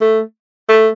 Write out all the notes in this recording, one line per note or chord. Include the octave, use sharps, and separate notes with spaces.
A3
A3